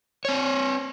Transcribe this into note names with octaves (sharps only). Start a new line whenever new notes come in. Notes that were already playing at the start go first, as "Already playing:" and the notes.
C4 C#5